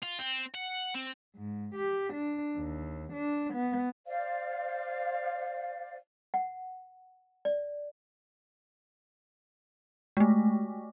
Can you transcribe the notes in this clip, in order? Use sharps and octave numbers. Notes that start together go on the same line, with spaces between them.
F4
C4
F#5
C4
G#2
G4
D4
D#2
D4
B3
C5 D5 F5
F#5
D5
G#3 A3